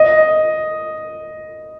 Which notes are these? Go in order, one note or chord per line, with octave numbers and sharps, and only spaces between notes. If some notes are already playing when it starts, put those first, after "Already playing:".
Already playing: D#5